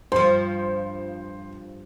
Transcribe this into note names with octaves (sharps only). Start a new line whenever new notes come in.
G2 F3 C5